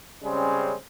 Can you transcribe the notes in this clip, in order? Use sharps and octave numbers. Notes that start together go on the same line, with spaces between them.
C#3 G3 G#3 C4 C#4